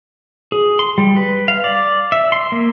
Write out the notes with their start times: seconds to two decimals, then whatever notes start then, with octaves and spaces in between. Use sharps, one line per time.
0.52 G#4
0.79 C6
0.98 G3
1.16 B4
1.48 F5
1.64 D5
2.12 E5
2.32 C6
2.52 A#3